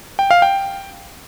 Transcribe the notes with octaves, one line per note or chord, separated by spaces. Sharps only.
G5
F5
G5